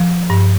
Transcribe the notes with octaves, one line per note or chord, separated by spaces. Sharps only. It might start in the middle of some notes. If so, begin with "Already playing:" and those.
Already playing: F3
G2